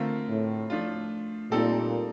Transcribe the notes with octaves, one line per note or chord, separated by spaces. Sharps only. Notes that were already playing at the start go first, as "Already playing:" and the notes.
Already playing: D3 A3 C4 F4 A#4
A2
F3 A3 D4 F4
A#2 G3 C4 D#4 A4 D5